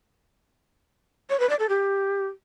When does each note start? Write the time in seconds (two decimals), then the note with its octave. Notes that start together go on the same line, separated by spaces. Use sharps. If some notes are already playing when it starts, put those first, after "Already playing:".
1.30 C#5
1.40 B4
1.49 D5
1.59 A4
1.69 G4